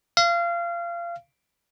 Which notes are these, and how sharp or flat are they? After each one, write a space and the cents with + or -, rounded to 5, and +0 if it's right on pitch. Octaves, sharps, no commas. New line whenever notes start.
F5 -25